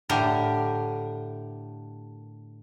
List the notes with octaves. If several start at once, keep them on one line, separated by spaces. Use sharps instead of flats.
A2 D3 G4 A#4